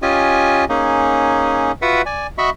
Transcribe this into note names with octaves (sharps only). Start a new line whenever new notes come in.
C#4 F4 G4 D#5 G#5
A#3 C#4 D#4 G#4
F4 F#4 B4 E5 F#5
D5 G#5
F#4 D#5 E5 B5 C#6